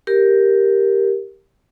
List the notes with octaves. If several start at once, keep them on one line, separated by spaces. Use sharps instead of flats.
G4 A#4